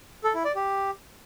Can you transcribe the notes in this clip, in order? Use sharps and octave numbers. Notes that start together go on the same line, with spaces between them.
A4
E4
D5
G4